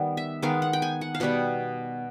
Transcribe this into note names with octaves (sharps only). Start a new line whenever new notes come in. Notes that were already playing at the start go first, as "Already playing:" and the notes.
Already playing: D#3 G3 B3
E5
D#3 G#3 B3 F5
F#5
G5
G#5
F#5
F5
B2 G3 B3 F#5